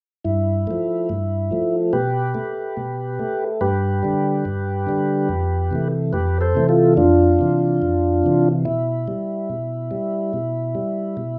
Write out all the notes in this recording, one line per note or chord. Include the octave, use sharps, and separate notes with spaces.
G2 E4
F3 A3
G2
F3 A3
B2 G4 B4
A3
B2
A3
G2 G4 B4
D3 G3
G2
D3 G3
F2
C3 E3 A3
F2 G4 B4
A4 C5
C3 E3 A3
F4 A4
F2 D4 F4
C3 E3
F2
C3 E3
B2 E4
G3
B2
G3
B2
G3
B2